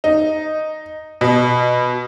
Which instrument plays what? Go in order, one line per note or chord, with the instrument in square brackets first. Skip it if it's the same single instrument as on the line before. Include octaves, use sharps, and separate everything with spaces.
[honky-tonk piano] D#4
B2